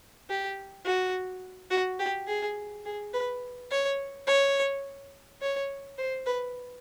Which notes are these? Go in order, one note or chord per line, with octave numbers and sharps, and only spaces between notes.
G4
F#4
F#4
G4
G#4
G#4
B4
C#5
C#5
C#5
C5
B4